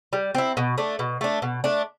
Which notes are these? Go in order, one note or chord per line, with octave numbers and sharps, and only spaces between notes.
G3
C4 E4
B2
A3 D4
B2
A3 D4
B2
A3 D4